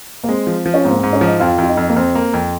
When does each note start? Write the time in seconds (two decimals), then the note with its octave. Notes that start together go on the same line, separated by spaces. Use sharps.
0.24 A#3
0.29 G#3 C4
0.47 F3
0.66 F3
0.74 C#4
0.84 G#2 C4
0.91 A#3
0.98 C4
1.04 G#2
1.13 C#4
1.21 F3 D#4
1.40 F2 F4
1.58 F2 F4
1.68 D#4
1.77 F2
1.89 A#3
1.96 F2 C4
2.15 A#3
2.34 F2